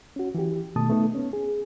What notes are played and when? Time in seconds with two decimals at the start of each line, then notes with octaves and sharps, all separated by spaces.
0.16 C#4 F#4
0.35 E3 G4
0.76 B2 D#3 A3 A5 D#6
0.90 A3 B3 D#4 A4
1.14 B3 C#4
1.33 G#4